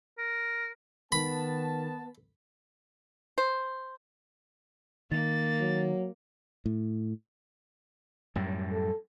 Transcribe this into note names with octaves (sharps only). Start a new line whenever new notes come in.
A#4
D#3 B3 A5 B5
C5
D#3 A#3 A6
F#3
A2
F#2 A2 G3
A4